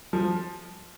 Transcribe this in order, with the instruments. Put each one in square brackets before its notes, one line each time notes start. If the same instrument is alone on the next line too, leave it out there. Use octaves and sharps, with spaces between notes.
[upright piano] F3